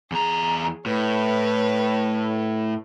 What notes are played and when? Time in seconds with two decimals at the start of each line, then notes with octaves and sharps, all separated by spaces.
0.12 E2 G#4 A#5
0.86 A2 B4 C#5